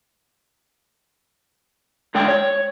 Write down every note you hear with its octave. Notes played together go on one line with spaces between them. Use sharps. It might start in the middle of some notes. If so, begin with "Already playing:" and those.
D2 D3 G#3 G5
C#5